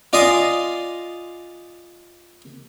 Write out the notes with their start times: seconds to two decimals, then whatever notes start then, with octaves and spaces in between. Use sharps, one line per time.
0.13 F4 D5 D#5 G#5 C6 D#6